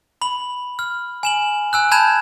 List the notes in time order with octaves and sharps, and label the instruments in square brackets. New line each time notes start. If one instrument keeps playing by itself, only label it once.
[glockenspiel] B5 F#7
F6
G#5 E7 F#7
G#5 E6 F#6
A5 B5 G6 G#6 E7